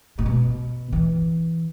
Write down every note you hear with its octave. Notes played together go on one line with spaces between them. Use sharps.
A2
B2
E3